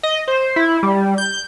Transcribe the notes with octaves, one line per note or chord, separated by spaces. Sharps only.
D#5
C5
E4
G3
G6